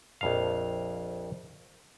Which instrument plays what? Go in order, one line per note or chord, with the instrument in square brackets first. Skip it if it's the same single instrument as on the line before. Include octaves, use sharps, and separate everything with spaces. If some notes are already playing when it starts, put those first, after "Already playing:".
[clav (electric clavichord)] A#1 F2 F5